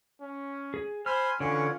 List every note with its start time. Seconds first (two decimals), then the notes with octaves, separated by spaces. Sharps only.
0.21 C#4
0.74 G#4
1.06 C5 G#5 B5 C6 F6
1.40 D3 E3 C#4 F4 C#5